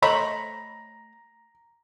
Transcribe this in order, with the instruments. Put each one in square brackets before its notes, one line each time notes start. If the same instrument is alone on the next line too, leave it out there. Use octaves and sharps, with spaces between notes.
[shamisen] A3 C5 C#5 [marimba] D#5 [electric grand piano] A#5 [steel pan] B5